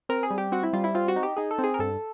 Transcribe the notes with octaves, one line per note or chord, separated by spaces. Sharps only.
C4 A#4
G#4
G3
G4
C4 F#4
E4
G3 F4
E4
C4 F4
F#4
D#4
G4
D#4 G#4
A4
C4
G#4
A#4
G2 A4